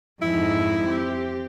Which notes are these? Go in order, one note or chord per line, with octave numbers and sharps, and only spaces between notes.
F2 G#2 D#4 E4
C4 G4